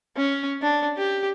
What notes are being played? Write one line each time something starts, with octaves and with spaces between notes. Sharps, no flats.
C#4
D4
G4